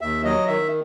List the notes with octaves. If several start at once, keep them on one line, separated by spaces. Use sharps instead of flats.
D#2 E5
F#3 D#5
D#3 E5